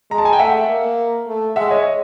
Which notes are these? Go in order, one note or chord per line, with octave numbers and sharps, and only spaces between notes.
G#3 A#5
A5
G#5
G5
A3 E5 F#5
A#3
A3
G#3 E5 F#5
C#5 D#5